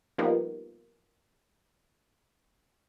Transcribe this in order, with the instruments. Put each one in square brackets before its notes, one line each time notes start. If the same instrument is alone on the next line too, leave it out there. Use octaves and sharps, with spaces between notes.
[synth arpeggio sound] F3 G3 A#3 B3 D#4